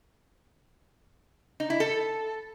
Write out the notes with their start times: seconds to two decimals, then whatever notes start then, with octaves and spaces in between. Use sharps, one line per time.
1.60 D#4
1.70 E4
1.80 A4